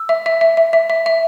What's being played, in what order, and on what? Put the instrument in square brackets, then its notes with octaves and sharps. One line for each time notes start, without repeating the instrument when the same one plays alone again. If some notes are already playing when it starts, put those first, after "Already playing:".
Already playing: [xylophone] E6
E5
E5
E5
E5
E5
E5
E5